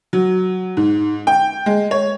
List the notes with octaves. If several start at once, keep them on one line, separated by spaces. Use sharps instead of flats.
F#3
G#2
G5
G#3
C#5